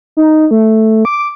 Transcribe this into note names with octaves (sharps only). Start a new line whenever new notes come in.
D#4
A3
D6